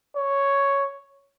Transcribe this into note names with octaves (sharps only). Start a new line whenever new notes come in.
C#5